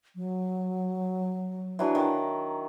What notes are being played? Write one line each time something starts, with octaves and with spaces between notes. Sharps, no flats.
F#3
E3 F#3 D4
D#3 A5